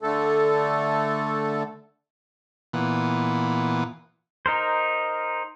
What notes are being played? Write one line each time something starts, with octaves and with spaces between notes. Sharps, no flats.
D3 A3 A4
A#2 E3 B3
D#4 A#4 C5